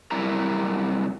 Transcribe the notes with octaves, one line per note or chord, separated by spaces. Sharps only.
F#2 C3 G3 E4 A#4 A#5